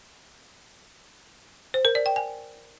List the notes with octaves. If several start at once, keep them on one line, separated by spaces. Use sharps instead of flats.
C5
A#4
D5
G5
G#5